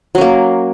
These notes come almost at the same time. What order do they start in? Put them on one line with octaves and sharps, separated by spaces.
F#3 C#4 A#3